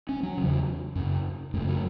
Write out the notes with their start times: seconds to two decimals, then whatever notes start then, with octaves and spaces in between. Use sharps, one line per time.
0.09 C#4
0.23 F#3
0.37 E2 C#3
0.96 F#2 C#3
1.54 F#2 C#3 A3
1.69 F#3